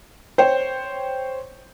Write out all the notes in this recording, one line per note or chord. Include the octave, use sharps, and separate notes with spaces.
C5 C#5 G5